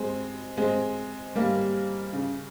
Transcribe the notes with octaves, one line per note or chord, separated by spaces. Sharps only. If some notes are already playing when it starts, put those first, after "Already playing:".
Already playing: G#3 C4
G#3 C4
G3 A#3
C#3